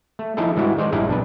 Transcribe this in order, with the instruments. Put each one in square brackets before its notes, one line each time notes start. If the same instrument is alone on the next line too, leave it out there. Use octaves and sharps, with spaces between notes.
[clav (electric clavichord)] A3
F3 D#4 E4 G#4 A4
G#2 E3 G3 G#3 E4 F#4
D#3 G#3 C5 D5
A1 G2 D#4 E4 G#4 D5
B1 D4 B4